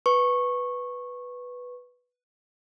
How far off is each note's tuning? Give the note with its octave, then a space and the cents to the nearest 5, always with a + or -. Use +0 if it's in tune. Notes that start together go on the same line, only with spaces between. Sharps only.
B4 +0 C#6 -15